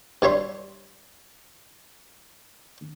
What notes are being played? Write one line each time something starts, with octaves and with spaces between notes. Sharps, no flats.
G2 G3 C#5 E5 C6